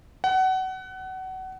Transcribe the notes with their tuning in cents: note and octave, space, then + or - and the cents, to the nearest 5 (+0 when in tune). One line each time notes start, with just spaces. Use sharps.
F#5 +25